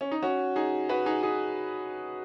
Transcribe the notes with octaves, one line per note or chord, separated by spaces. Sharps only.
C#4
D#4
C#4 F#4
D#4 G#4
F#4 B4
D#4 G#4
D#4 G#4